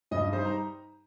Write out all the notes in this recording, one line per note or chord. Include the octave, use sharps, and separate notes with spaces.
G2 D#5
G3 D#4 C5
A#5